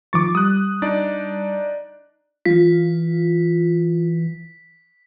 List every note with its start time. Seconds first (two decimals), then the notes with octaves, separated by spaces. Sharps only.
0.13 D#3 F3 C#6 D6 A6
0.35 G3 D#6 F#6
0.82 D4 D#4 D5
2.45 E3 F4 B6